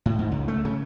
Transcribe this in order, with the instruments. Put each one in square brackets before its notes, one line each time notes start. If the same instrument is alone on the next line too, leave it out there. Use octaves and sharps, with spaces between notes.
[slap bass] A2
G#2
C#2
A3
C#3